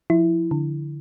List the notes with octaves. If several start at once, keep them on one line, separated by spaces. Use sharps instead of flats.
F3 E4
D3